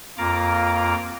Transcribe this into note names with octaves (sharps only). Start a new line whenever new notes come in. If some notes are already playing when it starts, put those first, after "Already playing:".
F2 A#3 F4 A#5 D6